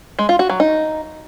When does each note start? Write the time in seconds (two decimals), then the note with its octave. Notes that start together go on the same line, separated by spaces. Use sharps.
0.19 G#3
0.29 F4
0.39 F#4
0.50 F#3
0.60 D#4